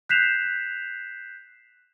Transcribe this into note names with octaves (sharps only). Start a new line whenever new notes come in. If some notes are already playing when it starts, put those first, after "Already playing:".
F#6 G6 B6 C7 E7 F7